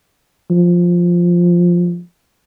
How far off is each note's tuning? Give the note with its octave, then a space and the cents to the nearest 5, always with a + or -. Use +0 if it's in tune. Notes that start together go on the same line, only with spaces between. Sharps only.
F3 +5